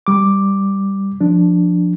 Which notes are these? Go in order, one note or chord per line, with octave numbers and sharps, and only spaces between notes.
G3 D6
F3 D4